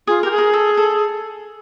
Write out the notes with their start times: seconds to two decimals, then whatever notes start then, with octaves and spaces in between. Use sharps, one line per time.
0.07 F4 G#4
0.23 G4 A#4
0.31 G#4
0.38 A#4
0.53 A4
0.77 A4